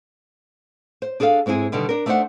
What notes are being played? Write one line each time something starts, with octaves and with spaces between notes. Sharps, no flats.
C5
D4 G#4 A4 C#5 F5
G#2 G#3 C4 E4 G#4
B2 D3 D#3 G3
D4 A#4
A3 D4 D#4 A#4 C5 F#5